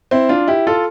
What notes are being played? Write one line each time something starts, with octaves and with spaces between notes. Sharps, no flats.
C4 E4
D4 F4
E4 G4
F4 A4